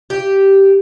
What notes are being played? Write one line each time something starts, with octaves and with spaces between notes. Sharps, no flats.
G4